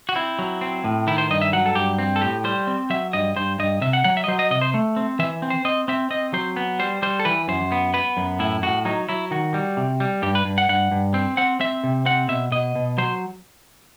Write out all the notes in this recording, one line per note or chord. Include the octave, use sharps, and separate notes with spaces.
F#4
C4 E4
F#3
C4
A2
D#3 E4
C5
G2 D#5
E5
F#3 F#5
A4
G2 G4
C4
A4
A2 G4
G3 C5
C4
F#3 E5
G2 D#5
G2 C5
G2 D#5
C3 E5
F#5
F#3 F#5
E5
D#5
F#3 C5
D#5
C3 D#5
C5
A3
C4
E3 E5
C4
C5
C4 D#5
C4 E5
C4 D#5
F#3 C5
B3
G3 C5
G3 C5
A4
E3 B4
F#2 C5
B3
B3 B4
F#2
A2 E4
A2 F#4
F#3 D#4
F#3 E4
D#3 F#4
G3
C3
G3
G2 G4
B4
G2
F#5
G2 F#5
G2
C4
C4 F#5
C4 E5
C3
C4 F#5
B2 E5
B2 D#5
B2
F#3 C5